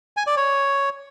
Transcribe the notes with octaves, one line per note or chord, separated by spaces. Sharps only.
G#5
D5
C#5